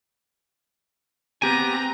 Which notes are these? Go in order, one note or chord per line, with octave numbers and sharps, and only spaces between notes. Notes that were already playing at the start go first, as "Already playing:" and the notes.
B3 C4 G4 G#5 A#5